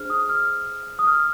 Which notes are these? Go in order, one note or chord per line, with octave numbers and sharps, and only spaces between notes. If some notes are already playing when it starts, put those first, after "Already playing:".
Already playing: D4 G#4 C5 F6
D#6
F6
D#6
F6